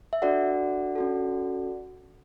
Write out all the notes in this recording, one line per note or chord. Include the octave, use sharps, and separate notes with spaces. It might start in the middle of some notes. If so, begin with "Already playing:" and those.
E5
D4 F#4 A4 D5 F#5
C#4 F#4 A4